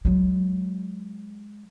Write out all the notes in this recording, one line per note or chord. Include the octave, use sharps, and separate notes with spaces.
F#3 G#3